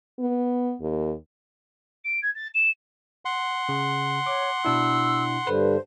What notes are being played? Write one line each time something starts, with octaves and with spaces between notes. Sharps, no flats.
B3
D#2
D7
G#6
A6
E7
F#5 C6
C#3
C#5 D6
B2 D4 E4 E6
G2 D3 B4 C5